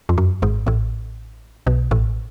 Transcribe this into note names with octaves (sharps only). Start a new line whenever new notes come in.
F2
F#2
G#1 G#2
A1 A2
B1 B2
A1 A2